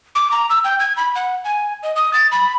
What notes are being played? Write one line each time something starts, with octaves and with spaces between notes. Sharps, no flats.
D6
A#5
E6
G5
G#6
B5
F#5
G#5
D#5
D#6
A6
B5